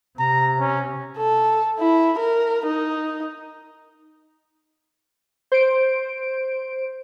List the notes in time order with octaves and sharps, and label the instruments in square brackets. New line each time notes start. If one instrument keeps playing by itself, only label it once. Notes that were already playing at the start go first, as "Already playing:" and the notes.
[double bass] C3 [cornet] A#5
[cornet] C#4
[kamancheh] A4
E4
A#4
D#4
[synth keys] C5 D7